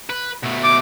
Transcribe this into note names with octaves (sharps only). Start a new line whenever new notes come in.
B4
B2 A3
D6